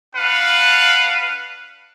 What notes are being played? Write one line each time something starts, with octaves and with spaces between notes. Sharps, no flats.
D4 B4 F5 F#5